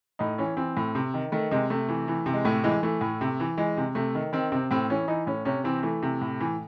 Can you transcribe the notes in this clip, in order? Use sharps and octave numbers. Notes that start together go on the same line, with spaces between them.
A2 D#4
E3 C#4
E3 C4
A2
C3
D#3
D#3 A3
C3 G#3
C3 A3
E3
E3
C3
G#3
A2 A3
E3 G#3
E3 A3
A2
C3
E3
E3 G#3
C3
C3 A3
D#3
D#3 C4
C3 C4
A2 C4
E3 C#4
E3 D#4
A2 C#4
C3 C#4
E3 C4
E3 A3
C3
A2
E3